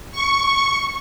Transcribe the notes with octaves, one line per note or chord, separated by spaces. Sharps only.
C#6